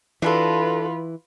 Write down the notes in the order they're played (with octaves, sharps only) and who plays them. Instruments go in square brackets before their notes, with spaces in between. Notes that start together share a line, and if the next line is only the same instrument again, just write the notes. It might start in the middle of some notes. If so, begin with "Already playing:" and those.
[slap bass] E3 [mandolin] D4 F#4 A4 [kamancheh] F4 B4